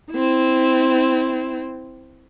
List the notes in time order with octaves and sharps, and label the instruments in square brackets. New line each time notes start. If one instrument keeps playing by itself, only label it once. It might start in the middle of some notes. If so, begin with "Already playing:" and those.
[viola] C4 E4